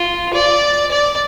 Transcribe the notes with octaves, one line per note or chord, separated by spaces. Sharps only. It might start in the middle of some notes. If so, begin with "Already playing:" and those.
Already playing: F4
D5
D5